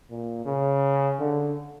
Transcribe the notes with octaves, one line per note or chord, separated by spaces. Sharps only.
A#2
C#3
D3